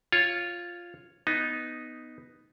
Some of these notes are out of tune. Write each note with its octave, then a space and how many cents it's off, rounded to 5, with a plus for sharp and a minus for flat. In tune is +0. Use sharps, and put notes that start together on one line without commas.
F4 +0 C#5 +0
B3 +5 D#4 +0